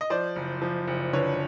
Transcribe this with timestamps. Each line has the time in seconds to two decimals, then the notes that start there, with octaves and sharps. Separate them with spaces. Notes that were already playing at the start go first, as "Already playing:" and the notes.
0.01 D#5
0.10 F3 C5 D5
0.36 F#1
0.62 F3
0.88 F#1
1.13 D3 B4 C#5